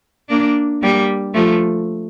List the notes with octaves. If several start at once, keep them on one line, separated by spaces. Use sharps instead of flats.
A#3 D4
G3 A#3
F3 A3